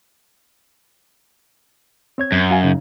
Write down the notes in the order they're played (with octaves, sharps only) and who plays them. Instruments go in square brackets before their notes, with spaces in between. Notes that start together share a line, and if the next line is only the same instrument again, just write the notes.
[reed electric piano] C4 C#5 G#6
[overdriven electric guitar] F#2
[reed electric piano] F#4 F5 G#5
C#3 D#4